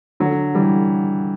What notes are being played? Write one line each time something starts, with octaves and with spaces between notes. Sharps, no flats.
D3 F#3
E3 G3